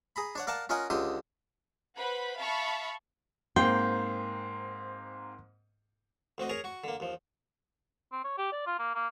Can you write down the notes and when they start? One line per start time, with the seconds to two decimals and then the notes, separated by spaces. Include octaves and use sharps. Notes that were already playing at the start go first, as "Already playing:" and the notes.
0.16 G#4 A#5 B5
0.35 D4 C#5 F#5
0.47 A#4 D5 F5 F#5 A5
0.69 C#4 F4 A#4 D#5 F#5 G#5
0.90 C#2 D3 G4 C6 D#6
1.97 B4 C5 F#5 B5
2.38 E5 F5 A5 B5 C#6
3.56 G#2 A#3 C4 G5 C6
6.38 D2 C4 F#4 D#5
6.49 G#4 A#4 C#5 G#5 A#5
6.64 F#4 C#6
6.84 D3 A#3
7.00 D#2 F3
8.12 C4
8.24 C#5
8.37 G4
8.52 D5
8.66 F4
8.79 A#3
8.95 A#3